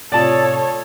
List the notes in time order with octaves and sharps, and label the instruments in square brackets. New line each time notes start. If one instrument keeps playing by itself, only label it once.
[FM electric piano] A2 C3 F4 [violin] A4 C#5 [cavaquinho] D5 A5 D#6